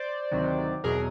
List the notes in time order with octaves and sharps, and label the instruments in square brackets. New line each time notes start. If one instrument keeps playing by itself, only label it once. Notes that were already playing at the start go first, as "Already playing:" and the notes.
Already playing: [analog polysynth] C5 D5
D2 C3 D#3 F#3
E2 B2 F#3 G#4 A#4